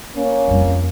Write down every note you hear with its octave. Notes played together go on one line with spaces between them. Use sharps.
A#3 C#4
F2 G3